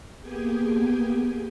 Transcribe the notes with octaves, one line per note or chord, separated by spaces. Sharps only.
A#3 B3 G4 G#4 G5 G#5